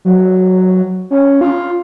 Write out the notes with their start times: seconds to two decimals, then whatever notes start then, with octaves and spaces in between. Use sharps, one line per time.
0.05 F#3
1.11 C#4
1.41 F4